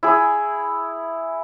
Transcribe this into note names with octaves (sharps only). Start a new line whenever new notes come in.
E4 G#4